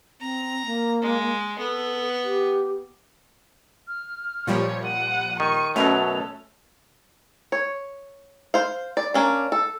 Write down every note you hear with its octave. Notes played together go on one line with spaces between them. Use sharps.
C4 A#5
A#3
G#3
B3 A4
G4
F6
A#2 F3 G3 C#5
F#5 D#7
D#3 C#6
F#2 B2 F#3 A3 C#4 A4 F7
C#5
C5 F5
D5
A#3 C#4 D4
A4